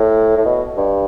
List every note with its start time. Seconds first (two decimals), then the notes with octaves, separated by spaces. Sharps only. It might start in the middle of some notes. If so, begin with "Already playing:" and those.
Already playing: A2
0.37 A2
0.45 B2
0.77 G2